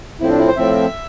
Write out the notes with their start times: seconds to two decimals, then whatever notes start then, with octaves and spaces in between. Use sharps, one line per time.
0.20 A2 F3 C4 E4
0.30 D4
0.39 E4
0.48 C5
0.57 A2 F3 C4 E5